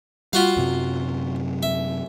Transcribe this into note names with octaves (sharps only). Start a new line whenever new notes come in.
G3 F4 F#4 F5
F#2 C3 F#3
E5